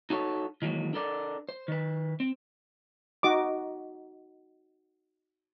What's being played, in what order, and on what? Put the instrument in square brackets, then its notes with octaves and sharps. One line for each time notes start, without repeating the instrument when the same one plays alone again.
[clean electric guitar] D#4 F#4 A4 C#5
D#3 E3 F#3 G#3 A#3
D4 A4 A#4 D5
C5
D#3 B4
C4
[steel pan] D#4 F#4 D#5 D6